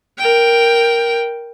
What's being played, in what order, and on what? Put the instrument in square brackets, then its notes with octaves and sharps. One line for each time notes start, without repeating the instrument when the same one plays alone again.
[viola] A#4 G5